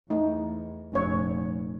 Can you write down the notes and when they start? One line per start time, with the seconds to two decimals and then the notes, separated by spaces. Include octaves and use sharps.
0.10 E2 A3 D#4
0.94 F1 A#2 C#4 C#5